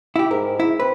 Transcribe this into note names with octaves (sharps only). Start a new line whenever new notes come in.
E4 G4
G#2 A#4
E4
C4 B4